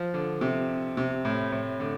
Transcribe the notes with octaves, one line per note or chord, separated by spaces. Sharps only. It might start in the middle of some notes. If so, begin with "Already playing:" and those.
Already playing: F3
D3
C3
C3
A2
A2
D3